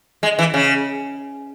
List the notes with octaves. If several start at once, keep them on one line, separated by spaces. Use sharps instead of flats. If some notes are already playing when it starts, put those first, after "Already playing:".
G#3
E3
C#3